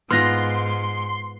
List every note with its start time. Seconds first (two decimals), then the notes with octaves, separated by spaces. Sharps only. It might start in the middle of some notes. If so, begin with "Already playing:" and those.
0.11 G#2 B3 F4 C6 F6 F#6 A#6